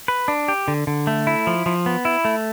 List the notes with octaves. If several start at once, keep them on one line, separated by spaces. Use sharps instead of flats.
B4
D4
G4
D3
D3
A3
E4
F3
F3
B3
E4
A3